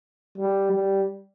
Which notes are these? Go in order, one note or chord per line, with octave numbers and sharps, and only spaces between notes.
G3
G3